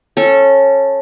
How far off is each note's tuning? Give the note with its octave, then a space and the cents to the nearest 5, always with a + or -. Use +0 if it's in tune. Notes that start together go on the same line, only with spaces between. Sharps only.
C#4 -15 A4 +0